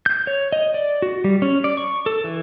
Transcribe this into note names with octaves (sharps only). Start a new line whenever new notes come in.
G6
C#5
D#5
D5
F#4
G3
C#4
D5
C#6
A4
E3